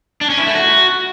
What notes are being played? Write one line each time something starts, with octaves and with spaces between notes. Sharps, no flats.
D4
C#4
E4
A3
F#4